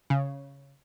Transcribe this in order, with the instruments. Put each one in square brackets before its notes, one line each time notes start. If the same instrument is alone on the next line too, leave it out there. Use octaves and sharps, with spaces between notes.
[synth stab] C#3